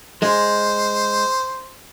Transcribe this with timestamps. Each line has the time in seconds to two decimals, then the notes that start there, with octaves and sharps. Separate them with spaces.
0.22 G#3 C5